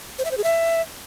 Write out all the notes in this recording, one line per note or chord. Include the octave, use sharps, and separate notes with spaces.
C5
E5
C5
G#4
E5